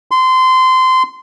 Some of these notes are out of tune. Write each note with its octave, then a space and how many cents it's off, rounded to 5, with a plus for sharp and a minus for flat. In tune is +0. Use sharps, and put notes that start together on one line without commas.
C6 -20